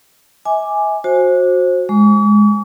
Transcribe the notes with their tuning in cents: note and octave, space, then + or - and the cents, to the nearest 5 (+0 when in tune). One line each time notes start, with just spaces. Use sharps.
E5 -40 G#5 +0 D6 +0
F#4 -15 C5 +20
G#3 +0 C#6 +45